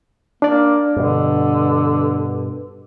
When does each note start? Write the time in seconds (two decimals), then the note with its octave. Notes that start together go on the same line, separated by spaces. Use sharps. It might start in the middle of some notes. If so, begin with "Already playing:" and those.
0.42 A#3 D4 D5
0.96 G2 B2 D3